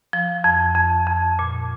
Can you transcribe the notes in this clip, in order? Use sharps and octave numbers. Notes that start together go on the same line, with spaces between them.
F3
F2
F2
F2
A#2